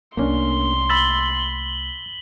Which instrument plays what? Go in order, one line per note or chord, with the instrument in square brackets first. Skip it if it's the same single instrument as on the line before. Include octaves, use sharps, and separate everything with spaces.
[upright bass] C2 A3 [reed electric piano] A#3 C#4 D4 [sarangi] C6
[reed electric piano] B5 E6 A6 [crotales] B6 F#7 G7